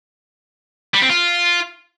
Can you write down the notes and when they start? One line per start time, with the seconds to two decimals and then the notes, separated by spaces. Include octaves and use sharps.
0.94 G3
1.02 C4
1.09 F4